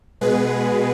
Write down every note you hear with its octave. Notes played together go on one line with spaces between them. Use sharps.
B2 G#3 B3 G#4 B4